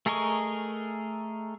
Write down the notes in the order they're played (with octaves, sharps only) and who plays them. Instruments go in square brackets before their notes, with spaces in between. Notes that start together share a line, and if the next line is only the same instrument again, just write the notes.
[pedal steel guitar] A3 G#4 A#4 D#5 C#6